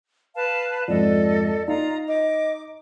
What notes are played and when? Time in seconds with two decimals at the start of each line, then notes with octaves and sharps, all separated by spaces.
0.35 B4 F5 A5
0.88 F2 G#2 A4 D5 D#5
1.68 D#4 F4 A#5
2.08 D#5 D6